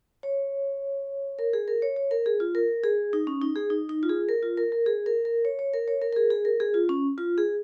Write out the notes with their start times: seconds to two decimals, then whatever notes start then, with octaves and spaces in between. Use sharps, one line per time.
0.23 C#5
1.39 A#4
1.53 G#4
1.68 A#4
1.82 C#5
1.96 C#5
2.11 A#4
2.26 G#4
2.40 F4
2.55 A#4
2.84 G#4
3.13 D#4
3.27 C#4
3.42 D#4
3.56 G#4
3.70 D#4
3.89 D#4
4.03 F4
4.09 G#4
4.29 A#4
4.43 F4
4.57 A#4
4.72 A#4
4.86 G#4
5.06 A#4
5.25 A#4
5.45 C#5
5.59 C#5
5.73 A#4
5.88 C#5
6.02 A#4
6.13 A#4
6.16 G#4
6.30 G#4
6.45 A#4
6.60 G#4
6.74 F4
6.89 C#4
7.18 F4
7.38 G#4